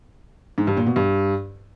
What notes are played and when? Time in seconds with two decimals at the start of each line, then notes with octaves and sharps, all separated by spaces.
0.58 G#2
0.67 G2
0.77 A#2
0.86 B2
0.96 G2